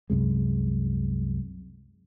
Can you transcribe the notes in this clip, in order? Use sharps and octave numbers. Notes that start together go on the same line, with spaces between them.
C2 F#2 C3 G#3